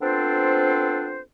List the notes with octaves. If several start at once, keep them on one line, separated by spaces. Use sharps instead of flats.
B3 C4 D4 F4 A4 C5